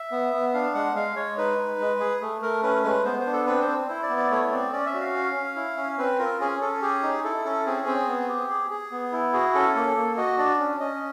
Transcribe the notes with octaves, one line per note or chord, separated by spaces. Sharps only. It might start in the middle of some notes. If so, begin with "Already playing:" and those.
Already playing: E5
B3
B3
D4 F5
G#3 F#5
G#3 F5
G#3 C#5
D#4 B4
D#4
G#3
G#4
A3
A3 A#4
C#4 B4
G#3 B4
B3 C5
C5
D4
A4
C4 B4
C5
C4
E4 C5
D5
B3
D5
A3 C#5
C4 D5
C#4 D5
E5
F#4
F5
C#4
C#4
E4
C#4
C4 B4
F4 A#4
C#4 G#4
C#4 A4
G4 G#4
D#4
E4 A4
C#4 A4
C4 G#4
C4
B3
G4
G#4
G#4
B3
E4
F#4 G#4
C#4 A4
A#3 A4
A#3
F#4 D#5
D4 D5
C#4
C#4 D#5